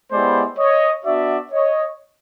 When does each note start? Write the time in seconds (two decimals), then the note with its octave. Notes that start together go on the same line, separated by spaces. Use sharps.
0.11 G#3 B3 E4 G4 C5 D5
0.58 C#5 D#5
1.05 B3 D4 F#4 D5 E5
1.51 C#5 D#5